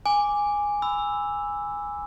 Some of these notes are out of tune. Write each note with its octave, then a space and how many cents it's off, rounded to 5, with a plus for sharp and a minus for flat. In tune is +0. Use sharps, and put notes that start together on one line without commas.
G#5 -10 D6 +0
B5 +25 E6 +0